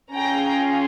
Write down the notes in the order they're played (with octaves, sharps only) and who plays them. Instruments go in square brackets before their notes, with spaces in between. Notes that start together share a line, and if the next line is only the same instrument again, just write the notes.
[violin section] C#4 F4 G#4 G5 A#5